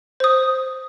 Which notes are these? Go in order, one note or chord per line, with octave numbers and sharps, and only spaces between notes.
C5 D#6